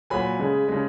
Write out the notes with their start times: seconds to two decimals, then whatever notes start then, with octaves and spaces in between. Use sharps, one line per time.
0.10 A#2 F#3 G#5 B5
0.39 C#3 G#3
0.69 C#3 G#3